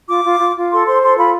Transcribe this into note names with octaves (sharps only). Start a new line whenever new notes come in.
F4 D6
F4
F4
F4
A4 C6
C5 C6
A4 C6
F4 B5